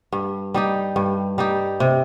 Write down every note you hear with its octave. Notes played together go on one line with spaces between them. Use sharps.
G2
G3 D#4 G4
G2
G3 D#4 G4
C3